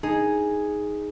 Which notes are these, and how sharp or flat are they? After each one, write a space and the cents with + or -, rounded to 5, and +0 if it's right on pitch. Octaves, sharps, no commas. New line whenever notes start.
D#4 +0 G#4 +0